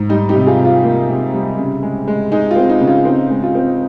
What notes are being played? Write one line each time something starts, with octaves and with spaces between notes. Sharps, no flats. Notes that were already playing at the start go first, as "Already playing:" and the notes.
Already playing: G#2
G3 D#4
D#4 G4
C3
F4 G#4
C3
F4
A#3
C3
G3
C#3
G#3
G#3
G#3 D#4
F4
C4
D#4
C#3
F4
C4 D#4
G#3
F4
C4